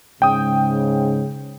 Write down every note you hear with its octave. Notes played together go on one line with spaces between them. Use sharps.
G#2 C#3 G5 D#6